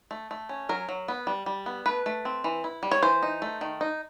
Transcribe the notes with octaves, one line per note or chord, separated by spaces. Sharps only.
A3
A3
C#4
F#3 A#4
F#3
B3
G3
G3
B3
A3 B4
A3
C4
E3
E4
G3
C#5
E3 C5
D#4
A3
D#3
D#4